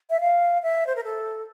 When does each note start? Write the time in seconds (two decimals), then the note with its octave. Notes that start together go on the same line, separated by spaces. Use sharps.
0.10 E5
0.20 F5
0.63 E5
0.87 C5
0.96 A#4
1.04 A4